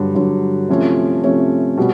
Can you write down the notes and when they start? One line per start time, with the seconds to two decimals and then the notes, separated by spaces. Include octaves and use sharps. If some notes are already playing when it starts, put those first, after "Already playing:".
Already playing: G2 D3 F#3
0.15 G2 D3 F#3
0.69 C3 F3 A3 C#4
1.23 C3 F3 A3 C#4
1.77 B2 G3